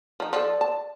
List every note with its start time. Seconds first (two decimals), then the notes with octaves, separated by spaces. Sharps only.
0.20 F3 D#4
0.33 F3 A4 D5
0.61 A5